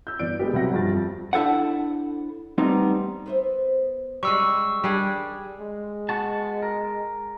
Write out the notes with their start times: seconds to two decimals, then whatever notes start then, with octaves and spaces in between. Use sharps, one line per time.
0.07 E6 G6
0.19 G1 E3 D5 D7
0.39 G#3 B3 G4
0.53 C2 F#3 E5 F#5 A#6
0.74 G2 F3 G4 A6
0.92 F2
1.33 D4 E4 A4 C5 F#5
2.58 G3 A3 B3 C4 D#4
3.26 B3 C5 E5
4.23 F#2 G3 G#3 C#4 C#6 E6
4.84 D#3 G3 D4 G#4
5.60 G#3
6.09 B3 F#4 A5
6.62 A#4